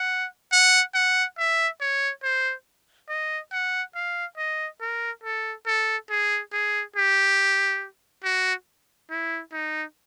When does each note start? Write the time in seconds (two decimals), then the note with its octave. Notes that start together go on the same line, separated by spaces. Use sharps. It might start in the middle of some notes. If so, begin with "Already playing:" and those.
Already playing: F#5
0.52 F#5
0.94 F#5
1.38 E5
1.81 C#5
2.23 C5
3.09 D#5
3.52 F#5
3.95 F5
4.37 D#5
4.81 A#4
5.24 A4
5.66 A4
6.10 G#4
6.53 G#4
6.96 G4
8.23 F#4
9.11 E4
9.53 D#4